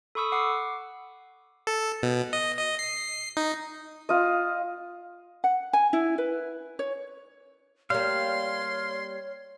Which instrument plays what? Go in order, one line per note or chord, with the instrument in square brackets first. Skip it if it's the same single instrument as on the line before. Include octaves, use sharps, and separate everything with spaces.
[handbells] A4 B5 C#6 D#6 E6
F#5 D6 C7
[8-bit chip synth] A4
B2
D#5
D#5
C7
D#4
[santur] F4 D#5
[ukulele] F#5
G#5
E4
B4
C#5
[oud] G3 A#3 [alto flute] C#5 [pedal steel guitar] F5 [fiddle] C6